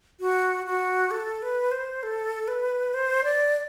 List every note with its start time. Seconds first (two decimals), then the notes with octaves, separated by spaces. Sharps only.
0.20 F#4
0.66 F#4
1.11 A4
1.42 B4
1.71 C5
2.03 A4
2.48 B4
2.94 C5
3.24 D5